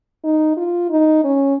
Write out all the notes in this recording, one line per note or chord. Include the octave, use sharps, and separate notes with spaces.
D#4
F4
D#4
C#4